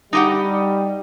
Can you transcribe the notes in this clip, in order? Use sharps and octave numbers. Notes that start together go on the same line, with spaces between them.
G3 D#4 G4 F#5